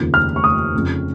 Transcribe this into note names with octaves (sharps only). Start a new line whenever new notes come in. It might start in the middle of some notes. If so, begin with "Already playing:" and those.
Already playing: F1 D#2 C#3 F3
F6
C#6
D#6
F1 F2 C#3